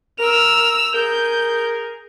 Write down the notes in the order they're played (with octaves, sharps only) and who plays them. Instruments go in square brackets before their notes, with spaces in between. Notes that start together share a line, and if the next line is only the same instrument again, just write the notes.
[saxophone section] A#4 [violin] E6 F7
[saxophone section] G#4 A#4 [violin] G6